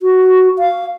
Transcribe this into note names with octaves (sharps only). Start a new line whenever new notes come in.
F#4
F5